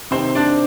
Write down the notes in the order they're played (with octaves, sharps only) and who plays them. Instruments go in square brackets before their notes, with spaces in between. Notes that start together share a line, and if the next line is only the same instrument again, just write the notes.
[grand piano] C3 D#3 C4 C5
D4 D5